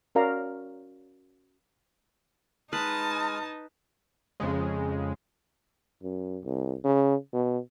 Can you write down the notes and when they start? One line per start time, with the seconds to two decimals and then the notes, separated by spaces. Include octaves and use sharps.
0.15 C#4 F#4 A#4 D5 F5 A#5
2.73 G#3 D#4 B4 A5 D#6 F6
4.40 F2 C#3 G#3
6.03 F#2
6.44 C2
6.84 C#3
7.33 B2